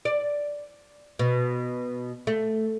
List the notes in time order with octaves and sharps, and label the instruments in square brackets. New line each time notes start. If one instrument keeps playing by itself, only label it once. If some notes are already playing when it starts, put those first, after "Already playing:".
[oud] D5
B2
A3